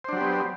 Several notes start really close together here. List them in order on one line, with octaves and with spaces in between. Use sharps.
C5 D4 F#3 G4 B3